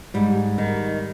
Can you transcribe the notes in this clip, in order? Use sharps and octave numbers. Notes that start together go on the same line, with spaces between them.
G#2 G3
D#3